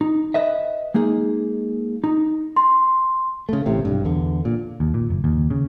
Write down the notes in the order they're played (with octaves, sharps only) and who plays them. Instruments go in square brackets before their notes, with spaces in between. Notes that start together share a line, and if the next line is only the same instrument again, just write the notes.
[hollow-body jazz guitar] D#4
B4 D#5 E5
G#3 A#3 D#4 G#4
D#4
[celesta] C6
[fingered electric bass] C#3 A3
A1 A2 C3
B1 G2
E2 D3
A#2
[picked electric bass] D#2
A#2
F#1
D#2
C#3